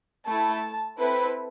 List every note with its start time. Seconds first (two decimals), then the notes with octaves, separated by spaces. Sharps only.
0.27 A3 E4 A4 A5
0.99 C4 E4 A4 B4